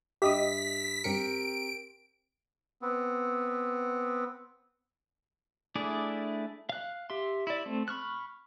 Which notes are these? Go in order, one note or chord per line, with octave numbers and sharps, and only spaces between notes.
G2 G4 D#5 E5 D#6 B6
G2 C4 G4 A#4 C#7 D7
B3 C4
A3 D4 E4 G#4 D5
F5 F#6
G4 E5 C6
E4 D5
A3 C4
B5 C#6 F6 F#6